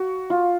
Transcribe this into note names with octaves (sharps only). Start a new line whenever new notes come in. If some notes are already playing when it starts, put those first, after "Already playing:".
Already playing: F#4
F4